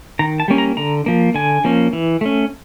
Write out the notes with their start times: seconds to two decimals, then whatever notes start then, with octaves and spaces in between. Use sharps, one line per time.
0.19 D#3 A#5
0.40 A5
0.48 G3 A#3 C#4
0.58 A#5
0.77 D3 A#5
1.06 F3 A#3
1.34 D3 G#5
1.64 F3 A#3 C#4
1.93 E3
2.21 A3 C#4